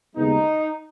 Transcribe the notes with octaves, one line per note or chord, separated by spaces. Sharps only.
D#2 C#3 G#3 B3 D#4